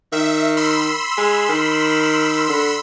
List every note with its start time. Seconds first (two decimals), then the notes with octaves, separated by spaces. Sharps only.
0.12 D#3 E5
0.57 B5 C6 E6
1.18 G#3
1.49 D#3
2.49 D3